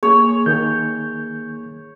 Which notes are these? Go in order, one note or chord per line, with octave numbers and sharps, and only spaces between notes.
A#3 G#4 C#5
D#3 A#3 G#4 G6